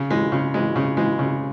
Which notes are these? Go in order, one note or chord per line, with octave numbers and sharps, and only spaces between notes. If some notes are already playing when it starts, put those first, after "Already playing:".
Already playing: C#3
E3 G#3
C#3
E3 G#3
C#3
E3 G#3
C#3